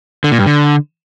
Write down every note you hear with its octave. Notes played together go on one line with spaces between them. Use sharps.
D3
A#2
G2
D3